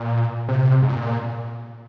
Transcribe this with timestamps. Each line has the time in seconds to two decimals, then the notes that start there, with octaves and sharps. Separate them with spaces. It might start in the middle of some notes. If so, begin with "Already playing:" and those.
Already playing: A#2
0.49 C3
0.82 G#2
0.89 A#2